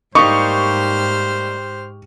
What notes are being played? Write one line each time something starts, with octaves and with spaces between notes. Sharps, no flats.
G#2 G3 A#3 D#4 G4 C5 C#6 F6